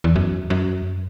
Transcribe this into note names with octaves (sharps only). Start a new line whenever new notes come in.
E2
F#2
F#2